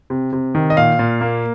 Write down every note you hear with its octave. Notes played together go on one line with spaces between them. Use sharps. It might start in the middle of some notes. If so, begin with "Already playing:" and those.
C3
C3
D#3
D#5
A#2 F5
A#2
A#3